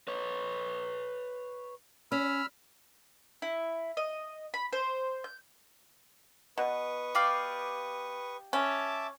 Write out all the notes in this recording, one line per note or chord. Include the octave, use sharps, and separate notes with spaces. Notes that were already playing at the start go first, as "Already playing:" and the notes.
B4 C#5
C#4 B5 E6 F6
E4
D#5
B5
C5
G6
B2 B4 C#6 D#6
G4 D5 F5
C#4 E5 A5 D6